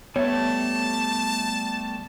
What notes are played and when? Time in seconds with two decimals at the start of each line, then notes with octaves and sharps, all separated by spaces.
0.16 G3 A3 B3 C#5 E5 A5